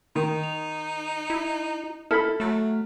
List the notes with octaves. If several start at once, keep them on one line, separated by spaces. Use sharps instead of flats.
D#3 D#4
F7
E4
E4 A4 B5 F6 B6
F#3 A3